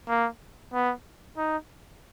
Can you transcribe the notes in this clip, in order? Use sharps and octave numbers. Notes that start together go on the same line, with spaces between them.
A#3
B3
D#4